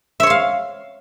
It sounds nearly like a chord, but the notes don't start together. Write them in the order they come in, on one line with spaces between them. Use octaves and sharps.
E5 C#5 C6 F5